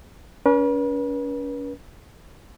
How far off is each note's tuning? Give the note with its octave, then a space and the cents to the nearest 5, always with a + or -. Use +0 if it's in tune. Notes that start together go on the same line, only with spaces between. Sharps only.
C#4 +35 B4 -40